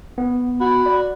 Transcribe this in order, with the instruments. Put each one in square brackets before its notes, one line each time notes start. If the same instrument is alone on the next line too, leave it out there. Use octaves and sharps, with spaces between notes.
[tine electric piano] B3
[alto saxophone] F#4 [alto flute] B5
[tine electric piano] D5